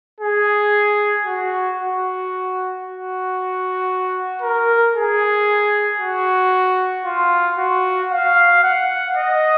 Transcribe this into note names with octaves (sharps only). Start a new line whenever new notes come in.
G#4
F#4
F#4
F#4
A#4
G#4
F#4
F4
F#4
F5
F#5
D#5